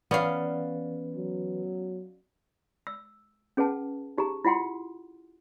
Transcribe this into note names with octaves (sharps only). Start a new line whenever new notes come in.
E3 B3 C#4 B4 D5 F5
F#3
E6
C#4 G#4 B4 F#5 A5
D#4 G4 G#4 A#5
E4 F4 F#5 G5 C6